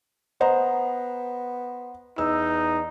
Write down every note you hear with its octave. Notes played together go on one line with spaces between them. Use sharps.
B3 C5 D#5 F#5 A#5
E2 D#4 E6